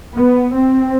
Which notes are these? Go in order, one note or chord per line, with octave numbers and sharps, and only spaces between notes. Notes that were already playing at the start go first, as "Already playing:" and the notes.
B3
C4